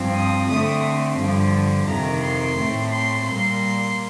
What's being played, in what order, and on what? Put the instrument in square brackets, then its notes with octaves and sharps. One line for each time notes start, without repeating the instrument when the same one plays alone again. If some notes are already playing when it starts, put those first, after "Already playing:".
Already playing: [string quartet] G2 F3 C4
D#6
D3 A3 C4 D#6
G2 D3 F3
F2 C3 D#3 A#5
C6
A2 A3 C4
C6
A#2 G3 A#3 C6